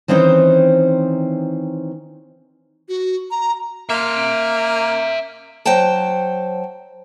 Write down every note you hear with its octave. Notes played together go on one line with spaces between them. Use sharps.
D#3 E3 C4 C#4 D#4 C5
F#4
A#5
A#3 E5 C6
F#3 C5 F#5 G5 A5